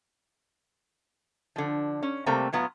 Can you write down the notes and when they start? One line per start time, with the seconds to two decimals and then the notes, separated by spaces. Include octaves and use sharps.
1.56 D3 F3
2.03 C#4
2.26 C3 G3 A3 A#3 C4 A#5
2.52 A2 F#3 B3 F4